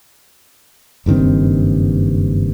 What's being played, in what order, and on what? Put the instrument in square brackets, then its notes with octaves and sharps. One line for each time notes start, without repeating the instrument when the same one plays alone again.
[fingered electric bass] F#1 G2 D#3 C4